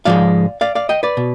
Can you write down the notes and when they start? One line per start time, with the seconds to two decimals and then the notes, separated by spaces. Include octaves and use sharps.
0.05 G#2 F3 G#3 D5 F5
0.61 D5 F5
0.75 D5 F5
0.89 D#5 G5
1.03 B4 D5
1.17 B2